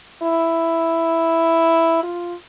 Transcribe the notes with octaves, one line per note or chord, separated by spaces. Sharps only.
E4
F4